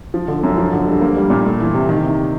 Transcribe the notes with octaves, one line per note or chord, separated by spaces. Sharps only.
F3
D3
F#2
F3
D3
G2
A#3
G3
A#2
A3
E3
C3
D#3
C3